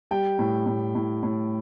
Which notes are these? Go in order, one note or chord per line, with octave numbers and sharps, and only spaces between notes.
G3 G5
A2
A2
A2
A2